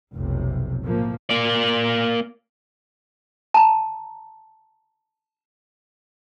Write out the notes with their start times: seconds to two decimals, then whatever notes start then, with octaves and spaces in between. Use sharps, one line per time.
0.15 F1 B1 C3
0.83 A2 F3 A#3
1.30 A#3 D5
3.54 A5 A#5